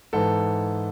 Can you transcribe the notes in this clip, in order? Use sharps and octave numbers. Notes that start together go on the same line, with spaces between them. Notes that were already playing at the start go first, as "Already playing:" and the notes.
G#2 E3 A4